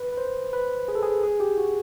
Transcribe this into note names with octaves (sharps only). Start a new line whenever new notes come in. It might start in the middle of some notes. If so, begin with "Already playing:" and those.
Already playing: B4
B4
C5
B4
G#4
A4
G#4
G#4
G4
F#4